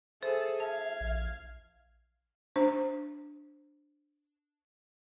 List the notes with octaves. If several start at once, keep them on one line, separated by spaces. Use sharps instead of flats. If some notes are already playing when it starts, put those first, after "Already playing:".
G#4 A4 C5 E5
F5 A5 G#6
A#1
D4 C5